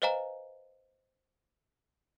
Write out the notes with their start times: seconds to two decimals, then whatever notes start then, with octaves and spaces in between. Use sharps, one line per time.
0.02 B4 C5 D#5 F5 G#5 A#5